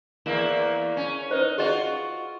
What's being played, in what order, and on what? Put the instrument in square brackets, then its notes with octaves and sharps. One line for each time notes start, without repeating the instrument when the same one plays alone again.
[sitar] E2 A#3 E4
C#4
[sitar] D#4 [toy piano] B4 C5
[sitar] F4 F#4 [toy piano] G#4 D#5